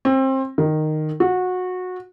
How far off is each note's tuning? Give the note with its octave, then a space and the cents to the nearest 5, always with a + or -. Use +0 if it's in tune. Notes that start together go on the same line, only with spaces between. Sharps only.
C4 +25
D#3 -10
F#4 -20